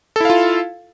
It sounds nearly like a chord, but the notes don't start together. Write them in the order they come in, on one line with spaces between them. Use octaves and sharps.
A4 E4 F5 F4